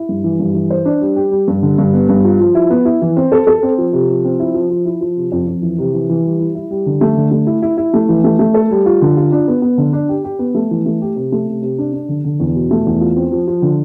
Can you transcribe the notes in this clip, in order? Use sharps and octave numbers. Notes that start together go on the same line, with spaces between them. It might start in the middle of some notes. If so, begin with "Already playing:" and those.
Already playing: E4
G2
E3
G2
E3
C5
D4
G3
G4
G3
G2
D3
G2
B3
G2
F4
F3
E4
B3
E4
E3
C4
A4
A4
C4
F3
C3
F3
C4
E4
F3
F3
E4
F3
C3
F2
F2
E3
C3
E3
E3
G3
E4
E4
G3
D3
A3
D3
A3
E4
E4
E4
A3
E3
A3
A3
A4
G3
F4
D3
F4
D4
B3
B3
D3
D4
G4
G4
B3
A3
E3
A3
G4
C3
A3
C3
C3
D4
D4
D3
D3
E2
B2
A3
E2
F4
C4
F3
F3
D3